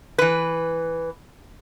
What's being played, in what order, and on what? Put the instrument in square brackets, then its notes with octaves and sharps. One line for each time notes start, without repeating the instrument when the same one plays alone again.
[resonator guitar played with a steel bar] E3 B4